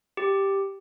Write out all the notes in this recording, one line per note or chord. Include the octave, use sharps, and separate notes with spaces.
G4